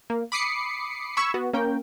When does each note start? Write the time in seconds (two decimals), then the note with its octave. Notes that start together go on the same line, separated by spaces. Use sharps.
0.10 A#3
0.32 B5 D6 D#6 C7 C#7
1.17 B5 C#6 E6 G#6
1.34 B3 F#4
1.53 A#3 C#4 A#4 G5